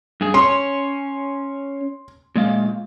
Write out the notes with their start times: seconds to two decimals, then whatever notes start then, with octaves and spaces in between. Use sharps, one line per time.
0.21 G2 G#4
0.34 C#4 C#5 C6
2.36 A#2 G#3 F5